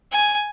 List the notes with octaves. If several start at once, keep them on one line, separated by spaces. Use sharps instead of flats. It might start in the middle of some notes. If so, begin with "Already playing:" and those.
G#5